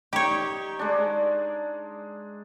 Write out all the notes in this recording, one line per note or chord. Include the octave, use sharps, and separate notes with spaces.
D#4 G4 C#5
G#3 D4